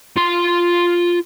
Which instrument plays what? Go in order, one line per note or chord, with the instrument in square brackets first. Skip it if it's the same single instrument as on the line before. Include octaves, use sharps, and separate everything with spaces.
[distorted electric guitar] F4 C6